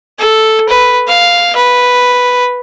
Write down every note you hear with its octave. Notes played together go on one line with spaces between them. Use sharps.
A4
B4
F5
B4